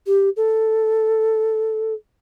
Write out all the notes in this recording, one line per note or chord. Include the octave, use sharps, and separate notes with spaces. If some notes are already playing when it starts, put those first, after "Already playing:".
G4
A4